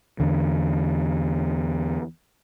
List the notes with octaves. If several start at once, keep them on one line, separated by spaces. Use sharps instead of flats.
E2 D3